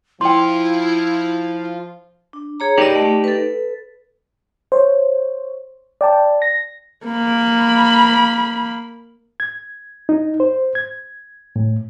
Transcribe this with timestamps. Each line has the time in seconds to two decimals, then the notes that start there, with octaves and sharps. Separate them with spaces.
0.21 F3 E4 F4 G5 C6
2.33 D4
2.60 G#4 C#5 A#5
2.78 D#4 G4 A#4 D5 D#5
2.95 A3
3.24 A4 B4
4.72 C5 C#5
6.01 D5 G5 A5
6.42 A#6
7.06 A#3 B5
9.40 G#6
10.09 D#4
10.40 C5
10.75 G#6
11.56 A2